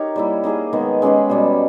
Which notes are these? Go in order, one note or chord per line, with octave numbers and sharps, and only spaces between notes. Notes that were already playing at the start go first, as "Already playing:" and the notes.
Already playing: D#4 G4 A#4 C#5
G3 A#3 E4
A#3 D#4 G#4 D#5
D#3 G#3 B3
G#3 C#4 G4 B4
B2 G3 B3